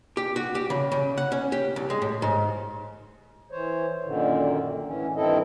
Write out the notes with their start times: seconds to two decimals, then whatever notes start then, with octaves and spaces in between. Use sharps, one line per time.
0.17 G4
0.36 F#4
0.55 G4
0.70 C#3
0.92 C#3
1.17 F#5
1.32 C#4
1.52 G4
1.76 C2
1.90 G#3
2.02 A2
2.22 G#2
3.51 E3 C5 C#5
4.04 F#2 A#2 D3 D#3
4.85 A2 E3 C#4
5.16 G2 D#3 C4 E4 A4 D#5